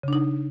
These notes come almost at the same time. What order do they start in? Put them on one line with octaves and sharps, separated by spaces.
C#3 D4 D#4